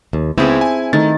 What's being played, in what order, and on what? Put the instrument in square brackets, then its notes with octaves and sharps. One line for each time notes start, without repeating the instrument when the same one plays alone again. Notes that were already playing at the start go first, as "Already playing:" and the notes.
[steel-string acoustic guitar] D#2
[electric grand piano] C#2 B3 [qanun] C4 G#4 A4 [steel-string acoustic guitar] E4
[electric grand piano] G#5
[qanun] D#3 [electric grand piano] A3 A6